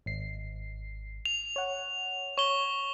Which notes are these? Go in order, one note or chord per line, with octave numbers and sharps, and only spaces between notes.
G#1 C7
F7
C#5 F#5
C#5 C#6 G7